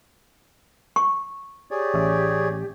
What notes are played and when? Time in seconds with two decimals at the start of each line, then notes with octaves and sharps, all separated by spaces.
0.96 C#6
1.71 G4 G#4 C#5 D5
1.94 A1 C#4 E5